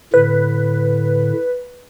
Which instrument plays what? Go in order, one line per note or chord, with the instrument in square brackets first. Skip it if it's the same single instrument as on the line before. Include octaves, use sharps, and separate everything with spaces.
[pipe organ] A2 D3 [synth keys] B4